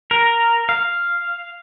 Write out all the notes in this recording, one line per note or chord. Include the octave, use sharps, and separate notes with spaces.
A#4
F5